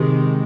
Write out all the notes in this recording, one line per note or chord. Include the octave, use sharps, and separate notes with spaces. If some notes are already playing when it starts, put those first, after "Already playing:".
Already playing: C3 D#3 G#3